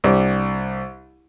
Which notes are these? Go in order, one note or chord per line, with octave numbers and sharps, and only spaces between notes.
C2 D4 G4